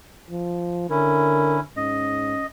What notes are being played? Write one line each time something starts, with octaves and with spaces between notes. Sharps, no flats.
F3
D3 C#4 E4 A#4
G#2 C#4 D#5